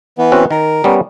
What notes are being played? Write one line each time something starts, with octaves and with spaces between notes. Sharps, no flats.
E3 B3
C4 C#4 F#4
D#3 A#4
G3 B3 C#4